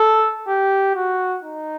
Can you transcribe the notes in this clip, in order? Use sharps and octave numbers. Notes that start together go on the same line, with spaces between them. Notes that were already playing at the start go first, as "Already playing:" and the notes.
Already playing: A4
G4
F#4
D#4